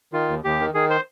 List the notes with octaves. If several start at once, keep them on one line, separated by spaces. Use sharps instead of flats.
D#3 F4
D#2
D#2 G4
D#3
D#3 G#4
C5